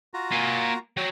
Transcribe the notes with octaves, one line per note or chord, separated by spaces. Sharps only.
F4 F#4 A#5
A#3 G#5
F#3 C#5 G5